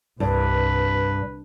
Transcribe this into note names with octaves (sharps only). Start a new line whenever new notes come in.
C2 G2 B4